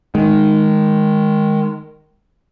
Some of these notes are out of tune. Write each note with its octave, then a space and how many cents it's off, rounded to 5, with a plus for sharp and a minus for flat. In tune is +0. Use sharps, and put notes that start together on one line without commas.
D#3 +0 G#3 +0